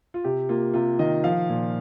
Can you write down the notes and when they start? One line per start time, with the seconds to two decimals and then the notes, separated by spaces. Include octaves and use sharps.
0.14 F4
0.24 C3 G4
0.49 A#3 F4
0.74 C3 F4
0.99 D#3 D#5
1.24 F3 F5
1.49 A#2